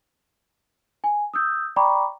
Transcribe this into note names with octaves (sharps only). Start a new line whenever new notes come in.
G#5
D#6 E6 G6
D5 G5 A#5 B5 C#6 D6